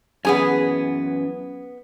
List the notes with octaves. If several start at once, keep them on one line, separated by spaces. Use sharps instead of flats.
F#2 E3 B3 G#4 G#5